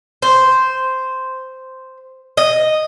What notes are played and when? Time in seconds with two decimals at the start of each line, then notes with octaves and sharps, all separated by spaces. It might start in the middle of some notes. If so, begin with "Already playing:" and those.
0.22 C5
2.37 D#5